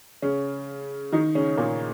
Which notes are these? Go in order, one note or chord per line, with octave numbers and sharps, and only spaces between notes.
C#3 C#4
D#3 D#4
C#3 C#4
A#2 A#3